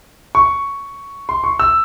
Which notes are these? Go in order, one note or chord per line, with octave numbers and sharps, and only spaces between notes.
C#6
C6
C#6
E6